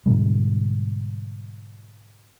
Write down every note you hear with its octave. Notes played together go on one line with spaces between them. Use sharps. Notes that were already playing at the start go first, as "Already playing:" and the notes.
G#2 B2 D3 G3